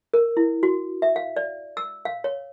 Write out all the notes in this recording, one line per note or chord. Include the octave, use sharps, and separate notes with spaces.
A#4
E4
F#4
E5
F5
D5
E6
F5
C#5